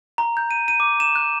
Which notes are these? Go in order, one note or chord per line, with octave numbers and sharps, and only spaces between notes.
A#5
G6
D#7
D#7
D6
E7
F#6